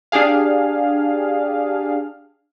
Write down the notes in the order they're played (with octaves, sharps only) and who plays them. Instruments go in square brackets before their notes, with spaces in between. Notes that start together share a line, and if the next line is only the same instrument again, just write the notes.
[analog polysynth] D4 G4 G#4 F5